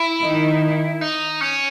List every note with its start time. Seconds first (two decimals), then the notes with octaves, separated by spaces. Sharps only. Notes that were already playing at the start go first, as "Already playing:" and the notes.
Already playing: E4
0.23 D#3 D#4
1.01 D#4
1.41 C#4